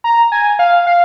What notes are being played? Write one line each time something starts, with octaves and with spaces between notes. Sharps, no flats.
A#5
G#5
F5
F5